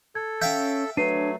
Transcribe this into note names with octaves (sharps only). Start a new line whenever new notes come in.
A4 G#6
C#4 E5 F5 G5 G6
F#3 A3 D4 B4 C#5 C7 D#7